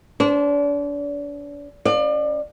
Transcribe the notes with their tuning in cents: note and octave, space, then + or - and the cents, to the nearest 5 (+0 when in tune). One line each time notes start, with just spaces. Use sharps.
D4 -35 C5 +0
C#4 +0 D5 +35 F5 +15